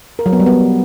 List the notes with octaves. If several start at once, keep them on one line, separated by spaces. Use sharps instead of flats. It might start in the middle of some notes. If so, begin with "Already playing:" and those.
A#4
F#3
B3
G3
B3